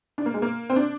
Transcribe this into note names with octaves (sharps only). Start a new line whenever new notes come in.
D4
A#3
G#3
A#3
C4
D4